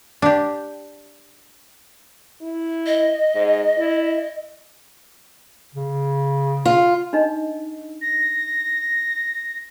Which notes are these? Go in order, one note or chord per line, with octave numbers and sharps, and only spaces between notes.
D4 G4
E4
D#5
G#2
E4
C#3
F4
D4 D#4 D#5
A#6